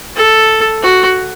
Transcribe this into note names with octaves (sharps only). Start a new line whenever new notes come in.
A4
F#4